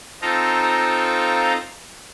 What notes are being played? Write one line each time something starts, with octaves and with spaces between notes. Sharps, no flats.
C4 D#4 F4 A4 A#5